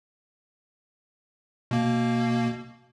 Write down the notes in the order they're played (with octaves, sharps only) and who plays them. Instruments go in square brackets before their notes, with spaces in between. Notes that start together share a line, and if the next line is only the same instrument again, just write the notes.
[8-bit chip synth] B2 A#3